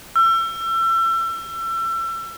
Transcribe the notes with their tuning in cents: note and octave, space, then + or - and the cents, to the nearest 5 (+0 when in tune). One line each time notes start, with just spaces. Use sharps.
E6 +30